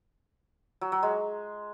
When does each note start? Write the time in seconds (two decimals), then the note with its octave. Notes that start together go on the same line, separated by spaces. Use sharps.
0.81 F#3
0.92 F#3
1.03 G#3